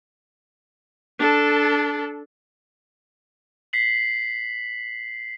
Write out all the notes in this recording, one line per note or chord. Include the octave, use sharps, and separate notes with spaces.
D4 A4
B6 C7 F#7